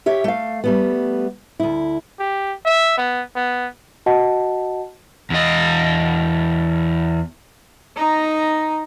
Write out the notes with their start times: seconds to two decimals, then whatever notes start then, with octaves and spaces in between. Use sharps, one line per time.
0.06 G4 C#5 E5
0.24 A3 F5
0.64 G3 A3 B3
1.60 D2 E4
2.20 G4
2.66 E5
2.98 B3
3.36 B3
4.06 F#4 D#5 F#5 A5
5.30 E2 D#5
7.96 D#4 A#5